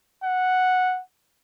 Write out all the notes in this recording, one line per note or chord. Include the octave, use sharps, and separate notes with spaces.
F#5